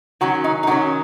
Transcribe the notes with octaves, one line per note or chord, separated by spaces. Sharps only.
D#3 F#3 C#4 F#4
D#4
D#4
D#3 F#3 C#4 F#4